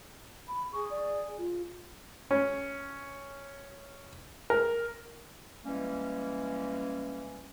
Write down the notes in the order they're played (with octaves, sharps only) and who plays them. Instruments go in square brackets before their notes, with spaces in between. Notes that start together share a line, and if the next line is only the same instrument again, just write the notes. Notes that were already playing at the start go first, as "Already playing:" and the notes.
[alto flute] B5
[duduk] G#4 [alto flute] C#6
[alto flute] D5
F4
[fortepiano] C#4
A#4
[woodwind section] E3 G3 G#3 A#3 C#4